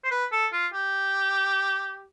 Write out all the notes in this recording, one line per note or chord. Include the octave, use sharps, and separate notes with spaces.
C5
B4
A4
F4
G4